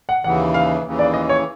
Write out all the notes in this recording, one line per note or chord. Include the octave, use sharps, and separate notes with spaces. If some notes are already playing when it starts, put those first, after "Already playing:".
F#5
D#2 C#3 E3 F#5
F5
D#2 C#3 E3
D5
D#5
C#5